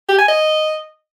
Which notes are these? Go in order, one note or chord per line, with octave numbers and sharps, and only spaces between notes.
G4
G#5
D#5